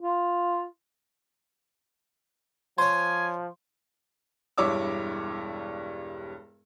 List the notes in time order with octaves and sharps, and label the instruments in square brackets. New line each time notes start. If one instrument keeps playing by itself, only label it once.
[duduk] F4
[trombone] F3 [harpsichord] C5 C#5 [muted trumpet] G#5 [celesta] C6
[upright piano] E1 G2 E4 C#5 D6 E6